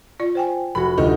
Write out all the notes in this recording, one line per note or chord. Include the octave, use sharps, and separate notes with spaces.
F4 D5
C5 G5 G#5
F1 F#4 B5
D2 C3 D#4 F4